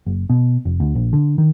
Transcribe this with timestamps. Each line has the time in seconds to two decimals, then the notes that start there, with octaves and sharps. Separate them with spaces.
0.06 F#1
0.30 B2
0.65 F1
0.80 D2
0.95 A#1
1.13 D3
1.38 D#3